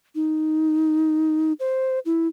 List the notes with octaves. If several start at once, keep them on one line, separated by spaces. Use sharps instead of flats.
D#4
C5
E4